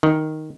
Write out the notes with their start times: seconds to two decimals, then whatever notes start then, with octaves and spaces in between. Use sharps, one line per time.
0.03 D#3